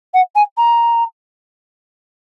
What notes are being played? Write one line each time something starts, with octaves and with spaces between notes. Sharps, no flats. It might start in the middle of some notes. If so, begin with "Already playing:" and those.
F#5
G#5
A#5